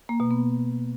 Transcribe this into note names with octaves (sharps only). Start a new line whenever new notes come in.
A#3
B2
B3